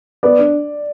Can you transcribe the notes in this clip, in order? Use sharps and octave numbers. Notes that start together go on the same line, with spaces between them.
B3 D5
D4